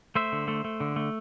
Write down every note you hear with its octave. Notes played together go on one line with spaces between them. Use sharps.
A3 C5 E5
D3
A3
A3
D3
A3